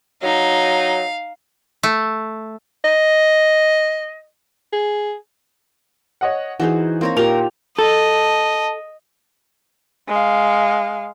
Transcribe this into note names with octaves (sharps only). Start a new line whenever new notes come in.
F#3 D#4 F5
A3
D#5
G#4
C#5 D#5 F#5
E3 D#4 F#4 G#4 C5
A#3 C4 C#5 A#5
A#2 F4 G4 A#4 F7
A4 D#5 A5
G#3 F5